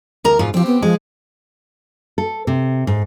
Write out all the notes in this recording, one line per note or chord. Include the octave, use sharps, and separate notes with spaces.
D2 A#4 A#5
G#2 B2 F4
F3 C4 G4
B3
F3 G#3
A4
C3
G#2